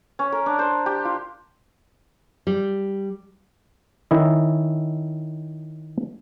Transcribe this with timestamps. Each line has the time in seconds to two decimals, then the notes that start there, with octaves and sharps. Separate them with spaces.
0.19 C#4
0.32 A#4
0.46 D4
0.59 C5
0.86 G4
1.05 F4
2.47 G3
4.11 D#3 C#4 E4 D#5